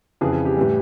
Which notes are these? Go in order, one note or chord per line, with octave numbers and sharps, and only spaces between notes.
F2 C#3 E3 G#4
G#4
G4
A2 E3 G3